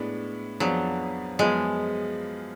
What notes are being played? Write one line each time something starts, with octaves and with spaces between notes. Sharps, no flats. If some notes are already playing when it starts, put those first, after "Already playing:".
Already playing: A2 G#3 B3 D4
F2 F3 F#3 B3 D4 G#4
F#2 F3 G#3 B3 F4 G#4